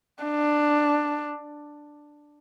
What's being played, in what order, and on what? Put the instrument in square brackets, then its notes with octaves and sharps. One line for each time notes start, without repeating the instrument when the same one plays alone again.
[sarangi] D4